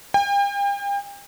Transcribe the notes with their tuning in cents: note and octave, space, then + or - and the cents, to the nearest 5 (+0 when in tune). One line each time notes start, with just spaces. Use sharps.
G5 +40